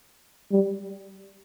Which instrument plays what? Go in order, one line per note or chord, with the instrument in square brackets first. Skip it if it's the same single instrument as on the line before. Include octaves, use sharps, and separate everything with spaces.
[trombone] G3